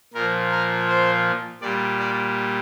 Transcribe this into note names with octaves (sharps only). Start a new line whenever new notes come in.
A#2 F3 A#4
A#4
C5
A#2 G3 D5
D5